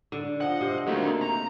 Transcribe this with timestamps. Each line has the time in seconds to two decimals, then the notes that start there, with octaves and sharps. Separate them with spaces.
0.12 D3
0.41 F3 D#5 F#5
0.61 C3
0.87 A3 A#3 D4 D#4 F#4
1.22 A#5